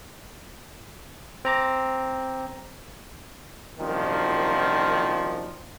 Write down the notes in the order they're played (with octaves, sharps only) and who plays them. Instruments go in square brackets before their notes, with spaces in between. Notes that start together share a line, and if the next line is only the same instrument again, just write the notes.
[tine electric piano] C4 A#5 D6
[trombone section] C2 F#2 A#2 D#3 F3